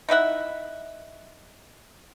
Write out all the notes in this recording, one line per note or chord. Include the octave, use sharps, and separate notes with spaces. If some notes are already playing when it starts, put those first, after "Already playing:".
D#4 E4 E5 F#5